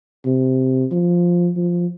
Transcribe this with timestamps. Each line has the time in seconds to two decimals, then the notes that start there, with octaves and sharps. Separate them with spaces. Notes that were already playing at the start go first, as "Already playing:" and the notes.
0.26 C3
0.91 F3
1.56 F3